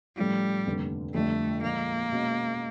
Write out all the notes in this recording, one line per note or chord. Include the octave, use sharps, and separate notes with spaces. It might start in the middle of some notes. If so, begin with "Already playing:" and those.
A2 F3 G3 A3 C#4 F4
F1 D#2 D3
F2 D3 G3 A3
A#2 F3 G#3 A#3
B2 G#3 C#4 F#4